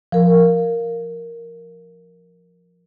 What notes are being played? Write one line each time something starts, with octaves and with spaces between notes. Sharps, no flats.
F3 A#4